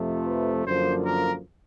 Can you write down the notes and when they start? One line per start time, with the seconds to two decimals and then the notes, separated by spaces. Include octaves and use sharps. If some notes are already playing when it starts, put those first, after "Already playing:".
Already playing: F2 C3 F3 A3
0.27 B4
0.64 F#2 D3 F3 A#3 C5
1.03 A#4